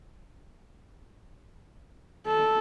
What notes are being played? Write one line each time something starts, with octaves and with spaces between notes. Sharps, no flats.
A4